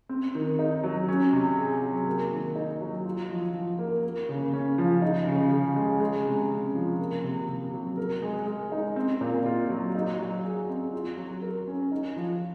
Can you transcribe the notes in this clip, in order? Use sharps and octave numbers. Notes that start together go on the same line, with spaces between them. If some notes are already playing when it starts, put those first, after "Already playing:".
C4
D#3
D#4
F#3
C#4
C3
G#4
F#3
A#3
D#3
D#4
F#3
F4
F3
F3
A#3
A#3
C#3
C#4
F3
D#4
C#3
C#3
G#3
G#3
C3
C#4
F3
A#3
C3
C3
F#3
A#4
G#3
G#3
D#4
C4
A#2
F4
F#3
D#4
F#3
G#4
C4
F4
F#3
A#4
C#4
D#4
F3